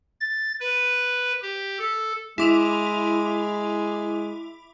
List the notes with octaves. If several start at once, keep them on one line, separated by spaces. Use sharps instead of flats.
A6
B4
G4
A4
G#3 E4 D6 F7